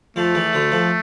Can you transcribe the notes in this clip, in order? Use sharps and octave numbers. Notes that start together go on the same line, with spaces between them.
F2 F3 A3
E2 E3
D2 D3
F2 F3